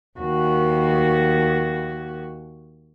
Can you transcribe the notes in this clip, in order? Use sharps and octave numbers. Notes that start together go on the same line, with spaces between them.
D#2 F#4